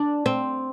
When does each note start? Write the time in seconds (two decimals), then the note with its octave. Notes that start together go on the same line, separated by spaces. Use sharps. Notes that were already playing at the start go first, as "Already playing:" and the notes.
Already playing: D4
0.26 C4